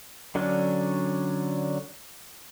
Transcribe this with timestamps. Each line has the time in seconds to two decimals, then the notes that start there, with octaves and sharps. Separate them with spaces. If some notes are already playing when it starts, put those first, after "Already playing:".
0.35 D3 F#3 C#4 D4